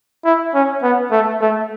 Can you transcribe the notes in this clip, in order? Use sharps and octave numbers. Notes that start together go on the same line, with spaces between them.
E4
C#4
B3
A3
A3